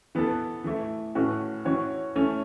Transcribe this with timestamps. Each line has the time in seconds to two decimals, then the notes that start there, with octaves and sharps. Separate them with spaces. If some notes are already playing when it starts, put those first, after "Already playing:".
0.15 E3 B3 A4
0.64 E3 A3 E4
1.15 A2 E3 C#4 F#4 B4
1.65 E3 C#4 F#4 C#5
2.16 E3 A3 C#4